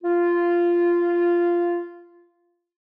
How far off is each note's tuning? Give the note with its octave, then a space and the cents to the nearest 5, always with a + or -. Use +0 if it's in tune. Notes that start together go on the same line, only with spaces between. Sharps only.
F4 -10